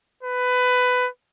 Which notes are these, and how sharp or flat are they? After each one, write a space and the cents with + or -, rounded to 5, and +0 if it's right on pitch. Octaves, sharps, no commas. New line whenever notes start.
B4 +15